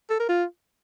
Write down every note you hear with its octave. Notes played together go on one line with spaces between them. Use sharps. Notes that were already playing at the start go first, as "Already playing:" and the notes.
A4
A#4
F4